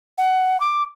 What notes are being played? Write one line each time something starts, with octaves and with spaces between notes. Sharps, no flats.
F#5
D6